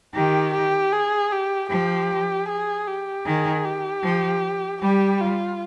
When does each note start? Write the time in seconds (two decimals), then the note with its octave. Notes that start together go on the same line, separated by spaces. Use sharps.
0.14 D#3 G4
0.54 G4
0.93 G#4
1.32 G4
1.70 F3 G4
2.48 G#4
2.87 G4
3.26 D#3 G#4
3.65 G4
4.03 F3
4.82 G3 G4
5.21 F4